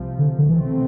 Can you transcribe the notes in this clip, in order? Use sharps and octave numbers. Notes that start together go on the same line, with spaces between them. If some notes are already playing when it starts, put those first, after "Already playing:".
Already playing: C2 C3 F3
D3
D3
C2 B2 E3 A3 C4